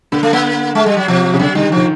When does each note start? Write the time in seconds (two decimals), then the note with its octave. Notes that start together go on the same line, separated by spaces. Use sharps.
0.12 D3 A#3
0.23 A3
0.33 A#3
0.75 G#3
0.86 G3
0.97 F#3
1.08 C3 F3
1.34 C#3
1.39 D3 F#3
1.55 D#3 G3
1.72 F3
1.77 D#3